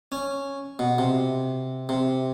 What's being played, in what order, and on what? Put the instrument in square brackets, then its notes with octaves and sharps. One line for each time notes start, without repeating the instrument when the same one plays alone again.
[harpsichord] C#4
B2
C3
C3